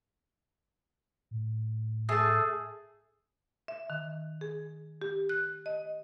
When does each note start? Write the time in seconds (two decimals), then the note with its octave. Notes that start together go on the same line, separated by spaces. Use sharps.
1.31 A2
2.09 A3 G#4 A5
3.68 E5
3.90 D#3
4.41 G#4
5.02 G4
5.29 F#6
5.66 D#5